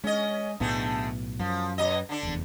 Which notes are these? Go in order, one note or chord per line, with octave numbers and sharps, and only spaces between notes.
G#3 C#4 D#5
B1 A2 D3 A3 B3 G#4
F#2 F3
B2 F#3 D#5
D3 D4
F1 E2